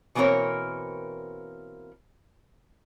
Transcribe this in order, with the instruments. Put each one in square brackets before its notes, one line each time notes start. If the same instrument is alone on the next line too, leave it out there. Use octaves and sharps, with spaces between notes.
[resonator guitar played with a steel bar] B2 E3 A#3 C4 A#4 C#5